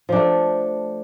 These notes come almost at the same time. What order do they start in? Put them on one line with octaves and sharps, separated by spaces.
F3 D4 A3